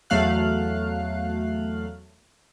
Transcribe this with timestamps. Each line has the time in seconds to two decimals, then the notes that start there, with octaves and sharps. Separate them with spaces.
0.10 E2 F#3 A3 F5 F#6